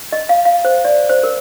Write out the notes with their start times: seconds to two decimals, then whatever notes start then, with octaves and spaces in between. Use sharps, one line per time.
0.12 D#5
0.29 F5
0.45 F5
0.65 C5
0.85 D5
1.10 C5
1.23 A#4